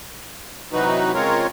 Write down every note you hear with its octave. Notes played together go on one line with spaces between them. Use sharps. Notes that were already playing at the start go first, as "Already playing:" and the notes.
C3 E3 F#3 D#4 F#4 B4
C#3 G#3 C4 F4 A#4 C#5